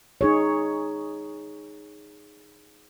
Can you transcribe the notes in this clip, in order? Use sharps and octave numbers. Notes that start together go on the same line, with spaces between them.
D#4 G#4 C#5